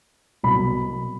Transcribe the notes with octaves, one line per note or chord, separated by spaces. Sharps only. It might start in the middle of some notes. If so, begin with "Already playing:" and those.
C2 B2 F#3 B5